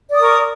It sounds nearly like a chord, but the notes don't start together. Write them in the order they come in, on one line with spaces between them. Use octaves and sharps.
D5 D#6 A#4 C#6